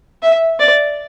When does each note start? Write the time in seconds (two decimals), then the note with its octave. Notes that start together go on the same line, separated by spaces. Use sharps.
0.23 E5
0.60 D5